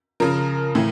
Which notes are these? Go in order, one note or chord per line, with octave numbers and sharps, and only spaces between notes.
C#3 F3 A#4
A2 E3